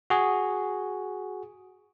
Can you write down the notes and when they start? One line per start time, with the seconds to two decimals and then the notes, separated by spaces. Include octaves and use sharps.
0.10 F#4 G#4